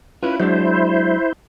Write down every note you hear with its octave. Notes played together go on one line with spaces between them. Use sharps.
C#4 E4 F4 B4
F#3 G#3 D4 E4 C5